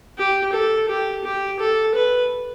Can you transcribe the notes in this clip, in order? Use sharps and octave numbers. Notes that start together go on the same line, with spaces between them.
G4
A4
G4
G4
A4
B4